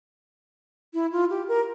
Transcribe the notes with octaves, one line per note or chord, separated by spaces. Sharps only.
E4
F4
G4
A#4